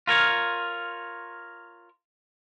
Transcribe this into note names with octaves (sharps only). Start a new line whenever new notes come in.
F4 A#4 C#5